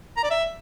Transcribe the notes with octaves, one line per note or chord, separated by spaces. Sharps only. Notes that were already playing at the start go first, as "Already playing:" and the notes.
A#5
D5
E5